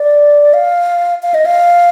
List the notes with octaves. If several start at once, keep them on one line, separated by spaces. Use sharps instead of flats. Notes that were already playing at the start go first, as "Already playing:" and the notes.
Already playing: D5
F5
F5
D#5
F5